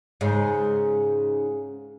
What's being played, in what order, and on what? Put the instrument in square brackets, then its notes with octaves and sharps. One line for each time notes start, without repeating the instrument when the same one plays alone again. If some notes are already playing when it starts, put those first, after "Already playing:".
[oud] G#2 C#3